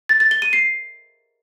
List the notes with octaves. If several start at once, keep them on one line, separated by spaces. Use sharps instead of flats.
A6
A6
G7
D#7
C7